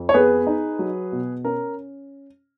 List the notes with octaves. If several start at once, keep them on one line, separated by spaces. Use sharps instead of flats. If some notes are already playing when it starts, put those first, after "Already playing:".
Already playing: F2
C#5
B3 G#4 B4
D#4
F#3
B2
C#4 A#4